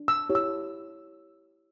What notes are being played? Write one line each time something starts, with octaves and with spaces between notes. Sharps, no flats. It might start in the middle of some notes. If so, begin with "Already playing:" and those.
Already playing: D4
E6
E4 G4 C#5
E6